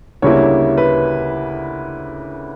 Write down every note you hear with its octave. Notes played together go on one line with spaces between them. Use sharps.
D2 C#3 G3 A#3 E4 C#5
B4